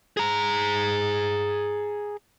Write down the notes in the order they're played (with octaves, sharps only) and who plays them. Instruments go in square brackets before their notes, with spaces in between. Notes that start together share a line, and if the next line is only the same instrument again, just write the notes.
[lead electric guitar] G#4 A#5